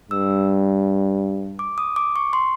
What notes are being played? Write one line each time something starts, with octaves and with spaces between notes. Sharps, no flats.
G2 E6
D6
D#6
D6
C#6
C6